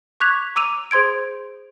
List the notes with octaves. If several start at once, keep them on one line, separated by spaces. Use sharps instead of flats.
C#6 D6 F#6 G#6 B6 F7
A#5 D6 E6 D#7 F7
G#4 C5 C6 G#6 D7